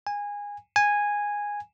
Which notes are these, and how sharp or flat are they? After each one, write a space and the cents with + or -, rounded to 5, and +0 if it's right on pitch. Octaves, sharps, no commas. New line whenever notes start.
G#5 -20
G#5 -10